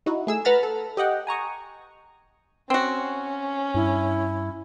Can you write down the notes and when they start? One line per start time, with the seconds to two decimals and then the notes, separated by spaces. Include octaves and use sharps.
0.06 D#4 E4 F#4
0.27 A3 G#4 E6
0.45 B4 F#5 A#5 B5 F6 A6
0.63 A4
0.97 G4 D#5 F#5 G5
1.27 G#5 A#5 C#6 D#6
2.70 C4 C#4 F#4
3.75 G2 E4